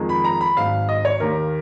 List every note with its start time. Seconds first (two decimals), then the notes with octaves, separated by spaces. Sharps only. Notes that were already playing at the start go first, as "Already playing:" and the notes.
Already playing: F2 D#3 G#3
0.09 B5
0.25 A#5
0.41 B5
0.57 G#1 G#2 F#3 F5
0.89 D#5
1.05 C#5
1.20 D#2 D#3 A#3 A#4